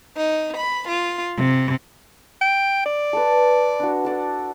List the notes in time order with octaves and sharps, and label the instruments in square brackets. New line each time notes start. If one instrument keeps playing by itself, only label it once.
[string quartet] D#4
B5
F4
C3
[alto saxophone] G5
D5
[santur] A4 B4
D4 F#4
A4 D5 F#5